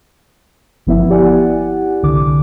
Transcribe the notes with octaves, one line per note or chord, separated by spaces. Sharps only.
G1 F3 B3 E4 E5
E4 G4 D5 F#5 G#5
C2 D3 D6